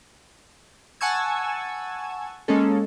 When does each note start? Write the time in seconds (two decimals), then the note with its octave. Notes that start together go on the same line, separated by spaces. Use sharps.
1.01 F#5 G#5 A5 C#6 E6 G#6
2.48 G#3 A#3 C#4 A4